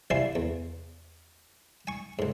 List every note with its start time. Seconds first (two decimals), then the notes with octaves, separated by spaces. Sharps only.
0.10 C2 F3 E4 D5 G#5 C6
0.35 E2
1.87 G#5 C#6
2.19 C#2 G#2